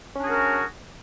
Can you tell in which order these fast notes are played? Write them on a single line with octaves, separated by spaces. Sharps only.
C#4 D4 G#4 F#4 A#4